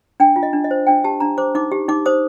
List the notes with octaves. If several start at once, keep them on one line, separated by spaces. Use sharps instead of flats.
D4 G5
F4
D#5
D4
D#5
C5
D4 G5
G4 A5
D4 A#5
C5 D6
D#4 D6
G4
D#4 D6
C5 D#6